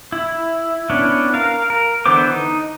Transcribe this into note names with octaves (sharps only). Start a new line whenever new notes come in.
E4
B3 C#4 D4 E4
A#4 F5
A#4
D3 E3 B3 C5 D6
D#4